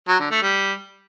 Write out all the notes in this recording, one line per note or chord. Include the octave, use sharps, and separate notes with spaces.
F#3
D3
A3
G3